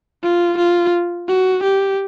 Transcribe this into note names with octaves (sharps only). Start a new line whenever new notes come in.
F4
F4
F#4
G4